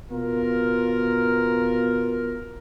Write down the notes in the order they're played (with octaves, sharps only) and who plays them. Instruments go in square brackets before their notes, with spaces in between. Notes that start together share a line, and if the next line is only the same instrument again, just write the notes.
[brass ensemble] B2 F4 A#4